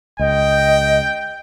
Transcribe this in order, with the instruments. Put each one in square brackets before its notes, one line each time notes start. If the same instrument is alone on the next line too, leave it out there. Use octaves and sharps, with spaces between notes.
[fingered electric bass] C#2 [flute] D#5 [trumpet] G5